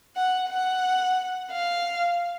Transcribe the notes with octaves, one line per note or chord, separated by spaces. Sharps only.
F#5
F#5
F5